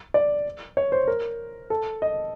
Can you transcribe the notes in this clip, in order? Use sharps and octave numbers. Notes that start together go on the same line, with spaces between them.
D5
C#5
C5
A#4
A4
D#5